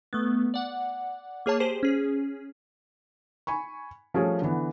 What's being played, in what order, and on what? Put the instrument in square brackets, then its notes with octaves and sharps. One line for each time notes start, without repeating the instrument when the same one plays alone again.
[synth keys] A3 B3
D5 F#5
A#3 G#4 C#5 A5
G4 G#4 C5
C#4 G#4
[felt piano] G#5 B5 C#6
F3 G3 A3 C#4 G#4
D3 E3 B3